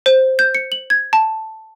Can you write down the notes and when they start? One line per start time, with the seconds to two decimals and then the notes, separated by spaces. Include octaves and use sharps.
0.06 C5
0.39 G6
0.55 C#7
0.72 F#7
0.90 G#6
1.13 A5